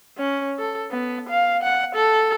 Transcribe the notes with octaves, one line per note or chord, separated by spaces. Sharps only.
C#4
A4
B3
F5
F#5
A4